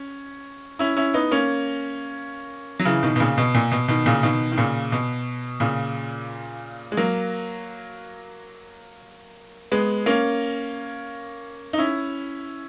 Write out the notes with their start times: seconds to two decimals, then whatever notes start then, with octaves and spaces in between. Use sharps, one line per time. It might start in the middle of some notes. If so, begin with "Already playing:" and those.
Already playing: C#4
0.79 C#4 E4
0.96 C#4 E4
1.14 B3 D#4
1.31 A#3 C#4
2.79 F#3
2.85 C#3 E3
3.03 B2 D#3
3.16 B2
3.20 A#2 C#3
3.38 B2
3.54 A#2
3.71 B2
3.88 B2 D#3
4.06 A#2 C#3
4.23 B2 D#3
4.52 D#3
4.57 A#2 C#3
4.92 B2
5.60 A#2 C#3
6.92 G#3
6.97 F#3 A#3
9.72 G#3 B3
10.06 A#3 C#4
11.73 D#4
11.78 C#4 E4